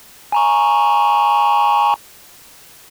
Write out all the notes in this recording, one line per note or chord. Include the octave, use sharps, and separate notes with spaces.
G#5 A#5 C#6